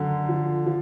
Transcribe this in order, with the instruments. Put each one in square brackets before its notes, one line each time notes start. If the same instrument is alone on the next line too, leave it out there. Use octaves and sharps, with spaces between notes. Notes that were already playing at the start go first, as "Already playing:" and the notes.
Already playing: [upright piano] F#2 D3
F3
F3